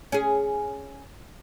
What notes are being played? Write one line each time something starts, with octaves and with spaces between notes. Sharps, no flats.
C#4 G#4